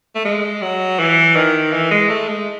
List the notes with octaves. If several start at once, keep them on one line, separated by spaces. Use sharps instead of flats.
A3
G#3
F#3
E3
D#3
E3
G#3
A3
G#3